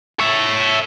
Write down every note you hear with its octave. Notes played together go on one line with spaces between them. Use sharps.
C#5 E5